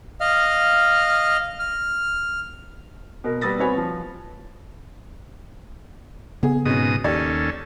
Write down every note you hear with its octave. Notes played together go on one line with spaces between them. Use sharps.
D#5 F5 F6
F6
B2 A#4
G3 B3 D#6 E6 A6 A#6
B3 C4 F#4 C#5 G#5 B5
F3
C#3 B3 G#4
G#2 B2 G#3 C#4 D#6
D#2 C#4 G4 A4 D5